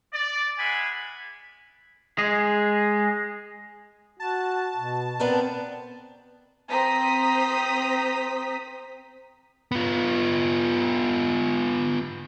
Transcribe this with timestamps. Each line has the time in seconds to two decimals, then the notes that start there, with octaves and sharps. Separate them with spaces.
0.13 D5
0.59 G#3 E5 F#5 G#5 B5
2.18 G#3 G#4
4.20 F#4 A5
4.76 B2
5.19 B3 C4 D4 A#4
6.69 C4 C5 A#5 D#6 B6
9.72 B3 F4